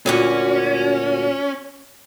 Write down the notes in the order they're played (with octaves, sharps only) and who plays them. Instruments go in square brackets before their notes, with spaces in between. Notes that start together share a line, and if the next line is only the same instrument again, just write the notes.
[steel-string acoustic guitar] D2 A#2 F#4 [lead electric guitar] C#4